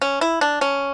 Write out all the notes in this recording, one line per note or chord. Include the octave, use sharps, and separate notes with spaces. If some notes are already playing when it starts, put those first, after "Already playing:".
C#4
E4
D4
C#4